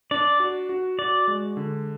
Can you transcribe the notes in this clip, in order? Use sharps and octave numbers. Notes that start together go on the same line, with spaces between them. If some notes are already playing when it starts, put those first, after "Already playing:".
D4 D5
F#4
F#4
F#4 D5
G#3
D3